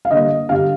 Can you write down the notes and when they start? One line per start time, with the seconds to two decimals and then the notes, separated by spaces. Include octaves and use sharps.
0.05 F5
0.11 D3 G3 A#3 D#5
0.49 G2 D3 G3 F5